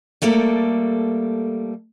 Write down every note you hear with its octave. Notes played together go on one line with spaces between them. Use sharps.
G3 A3 A#3 A4